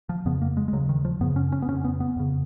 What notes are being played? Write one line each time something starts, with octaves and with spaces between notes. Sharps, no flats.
F3
F2 C#3 B3
A#3
G#3
G#3
D#2 C#3 F#3
D#3
F3
F#2 C#3 B3
C#4
C#4
B3
F2 C#3 C#4
B3
B3
F2 C#3